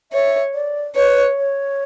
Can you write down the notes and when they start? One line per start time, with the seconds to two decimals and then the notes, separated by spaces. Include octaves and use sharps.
0.12 C#5 E5
0.54 D5
0.95 B4 C#5
1.37 C#5